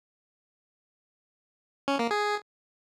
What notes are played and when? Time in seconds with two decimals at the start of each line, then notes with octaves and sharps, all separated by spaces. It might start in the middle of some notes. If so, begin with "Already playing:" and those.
1.88 C#4
1.99 A#3
2.11 G#4